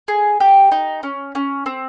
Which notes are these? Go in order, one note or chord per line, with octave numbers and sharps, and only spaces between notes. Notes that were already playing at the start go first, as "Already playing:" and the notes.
G#4
G4
D#4
C#4
C#4
C4